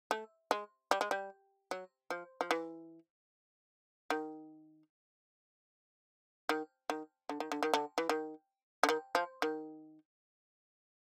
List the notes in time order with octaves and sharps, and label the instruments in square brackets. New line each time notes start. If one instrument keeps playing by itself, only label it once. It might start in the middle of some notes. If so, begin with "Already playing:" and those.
[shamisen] A3
G#3
G3
G#3
G3
F#3
F3
F3
E3
D#3
D#3
D#3
D3
D#3
D3
D#3
D3
E3
D#3
D3
D#3
F3
D#3